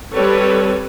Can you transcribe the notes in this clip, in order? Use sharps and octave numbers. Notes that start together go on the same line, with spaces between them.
G3 C4 A4 B4 C#5